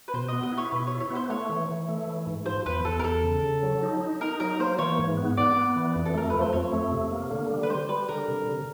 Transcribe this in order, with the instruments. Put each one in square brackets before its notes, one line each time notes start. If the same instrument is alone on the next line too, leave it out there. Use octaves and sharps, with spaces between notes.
[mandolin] B4
[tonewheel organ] B2 [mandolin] C5
[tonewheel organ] B3 [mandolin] D#5
[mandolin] D#5
[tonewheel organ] E4
[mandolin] C#5
[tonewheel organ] B2 [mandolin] B4
[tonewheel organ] E4 [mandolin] C#5
[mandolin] C#5
[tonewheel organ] B3 [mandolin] C5
[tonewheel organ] A3 [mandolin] C#5
[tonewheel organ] E3
E3
A3
E3
G#2
[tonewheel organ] F3 [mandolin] C5
[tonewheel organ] E2 [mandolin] B4
[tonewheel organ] E2 [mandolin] A4
[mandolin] A#4
[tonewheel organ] E2 [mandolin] A4
[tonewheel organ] C#3
C#3
F#3
D#4
D#4
[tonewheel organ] D#4 [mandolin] A#4
[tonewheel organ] F#3 [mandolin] A#4
[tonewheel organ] A#3 [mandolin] C5
[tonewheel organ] E3 [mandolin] C#5
[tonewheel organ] G#2
B3
[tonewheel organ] B3 [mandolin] D5
[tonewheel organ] B3
E3
F2
[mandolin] A4
[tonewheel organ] A3 [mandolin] A#4
[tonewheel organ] F3 [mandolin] B4
[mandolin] C5
[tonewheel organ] F2 [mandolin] C#5
[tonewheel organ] A3
C3
A#3
D3
G3
[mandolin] B4
[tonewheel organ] G3 [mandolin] C5
[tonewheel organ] G3 [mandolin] B4
[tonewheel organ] D3 [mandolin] A#4
[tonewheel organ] C3
C3